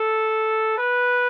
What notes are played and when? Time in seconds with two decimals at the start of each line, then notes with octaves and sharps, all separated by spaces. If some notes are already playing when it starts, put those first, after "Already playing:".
Already playing: A4
0.78 B4